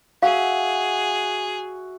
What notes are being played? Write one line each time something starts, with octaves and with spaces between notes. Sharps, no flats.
F#4 G#4 E5 F5